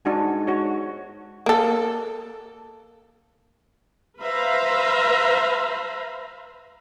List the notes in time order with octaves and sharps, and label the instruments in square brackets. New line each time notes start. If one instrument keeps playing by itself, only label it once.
[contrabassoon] G#2 [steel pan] D4 F#4 G#5
[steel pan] F#4 C#5
[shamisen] A#3 A4
[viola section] B4 C5 E5 F5 A#5 B5